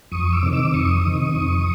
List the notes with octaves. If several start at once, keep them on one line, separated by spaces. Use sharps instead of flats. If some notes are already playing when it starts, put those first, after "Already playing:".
F2 C#6 D#6
D6 E6
C3 D#3
D6 E6
F2 C#6 D#6
C3 D#3
F2